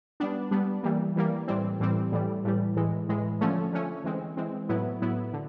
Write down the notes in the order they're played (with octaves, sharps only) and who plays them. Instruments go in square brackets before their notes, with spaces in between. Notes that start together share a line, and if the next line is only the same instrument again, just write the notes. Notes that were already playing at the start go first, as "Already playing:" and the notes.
[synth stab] G3 B3 D4
G3 B3 D4
E3 G3 A#3
E3 G3 A#3
A2 E3 G3 C4
A2 E3 G3 C4
A2 E3 G3
A2 E3 G3
A2 E3 G#3
A2 E3 G#3
D3 F3 A3 C#4
D3 F3 A3 C#4
E3 G#3 C4
E3 G#3 C4
A2 F#3 B3 E4
A2 F#3 B3 E4
D3